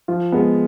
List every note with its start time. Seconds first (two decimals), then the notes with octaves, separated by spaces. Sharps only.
0.08 F3 F4
0.32 G#3 B3